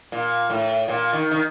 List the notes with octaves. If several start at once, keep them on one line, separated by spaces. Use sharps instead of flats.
A#2
A2
A#2
D#3
D#3